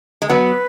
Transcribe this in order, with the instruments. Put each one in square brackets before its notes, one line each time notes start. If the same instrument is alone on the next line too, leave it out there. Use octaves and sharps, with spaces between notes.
[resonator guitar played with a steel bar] G#3
[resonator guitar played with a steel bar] F#3 B3 [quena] B4